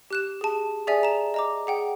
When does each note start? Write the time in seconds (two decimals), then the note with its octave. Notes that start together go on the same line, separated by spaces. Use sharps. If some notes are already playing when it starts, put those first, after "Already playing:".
0.11 G4 F#6 E7
0.41 G#4 A5
0.87 G#4 D5 E5 G#5
1.03 A#5 E7
1.34 D#5 A#5 D6
1.67 G#4 F#5 G5